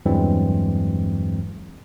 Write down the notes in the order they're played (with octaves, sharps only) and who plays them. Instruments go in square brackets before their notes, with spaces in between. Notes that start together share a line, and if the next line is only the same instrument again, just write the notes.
[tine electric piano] E2 G2 E3 F#3 G#3 C4